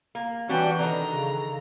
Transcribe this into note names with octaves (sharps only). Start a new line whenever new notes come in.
A#3
E3 G3 C#4 D4 F#4 G5
D3 D#3 A#5
C#3